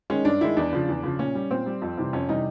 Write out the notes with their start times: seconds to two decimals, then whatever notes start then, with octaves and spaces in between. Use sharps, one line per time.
0.10 D#3 G#3 C#4
0.25 G2 D4
0.41 D#3 G#3 E4
0.57 E2 D4
0.73 C#3 F3
0.89 E2
1.03 C#3 F3
1.19 A#2 C#4
1.35 G3
1.51 A#2 C4
1.66 G3
1.82 F2
1.97 C3 E3 G3
2.13 F2 C#4
2.29 C3 E3 G3 D#4